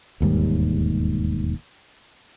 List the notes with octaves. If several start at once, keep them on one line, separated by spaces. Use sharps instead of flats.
E1 D#2 G#2 G3